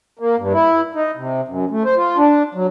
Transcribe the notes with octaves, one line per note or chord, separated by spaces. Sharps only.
A#3
G2
E4
D#4
C3
F#2
A3
C5
F4
D4
F#3